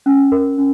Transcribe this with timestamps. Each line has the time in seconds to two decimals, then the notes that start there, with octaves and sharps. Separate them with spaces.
0.06 C#4
0.32 A#4
0.58 C#4